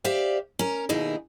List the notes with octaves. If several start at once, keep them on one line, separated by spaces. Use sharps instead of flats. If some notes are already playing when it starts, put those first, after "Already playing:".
G4 C5 D5 E5 F5
C#4 A#4
D#2 B2 D#4 E4 G#4